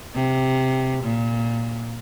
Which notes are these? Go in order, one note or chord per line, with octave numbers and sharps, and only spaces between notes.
C3
A#2